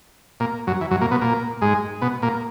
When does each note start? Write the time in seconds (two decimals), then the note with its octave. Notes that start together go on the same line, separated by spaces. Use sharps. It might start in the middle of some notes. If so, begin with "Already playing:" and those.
0.40 A#2 A#3
0.67 F#2 F#3
0.81 E3
0.91 F#2 F#3
1.01 A#2 A#3
1.11 B2 B3
1.21 A#2 A#3
1.61 G#2 G#3
2.02 B2 B3
2.22 A#2 A#3